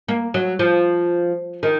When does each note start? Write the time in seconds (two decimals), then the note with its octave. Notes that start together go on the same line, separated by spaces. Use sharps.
0.08 A#3
0.34 F#3
0.59 F3
1.63 D#3